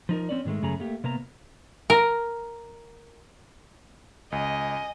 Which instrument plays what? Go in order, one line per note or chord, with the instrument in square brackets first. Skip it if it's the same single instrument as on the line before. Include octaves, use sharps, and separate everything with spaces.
[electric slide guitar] F3 D#4 A#4
C4 C#4 D5
G#2 D#3 G#3 A3
F#2 C#3 A3 G#4 A#5
A3 A#3 G4
C3 A#3 B3 A#5
[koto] A#4
[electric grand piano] C#2 [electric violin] D#5 [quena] G#5